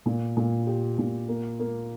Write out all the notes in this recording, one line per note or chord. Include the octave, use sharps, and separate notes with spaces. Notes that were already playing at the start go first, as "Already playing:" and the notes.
A#2
A#2
G4
A#2
A#3
A#3